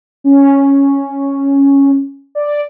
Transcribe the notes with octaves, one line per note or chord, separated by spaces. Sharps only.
C#4
D5